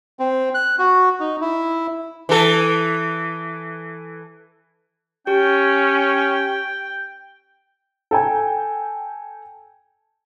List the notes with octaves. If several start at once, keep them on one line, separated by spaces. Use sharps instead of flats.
C4
F#6
F#4
D#4
E4
E3 A4
C#4 G4 G5
A4 G5 G#5